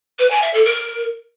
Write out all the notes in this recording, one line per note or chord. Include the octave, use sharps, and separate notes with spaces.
B4
G#5
E5
A4
A#4